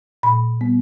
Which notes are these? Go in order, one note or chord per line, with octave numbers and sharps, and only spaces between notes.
A#2 B5
G3 B3